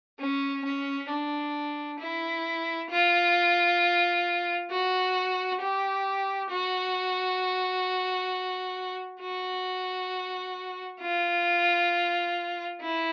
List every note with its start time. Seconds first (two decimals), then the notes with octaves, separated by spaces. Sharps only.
0.19 C#4
0.64 C#4
1.10 D4
2.00 E4
2.90 F4
4.71 F#4
5.61 G4
6.51 F#4
9.21 F#4
11.01 F4
12.82 E4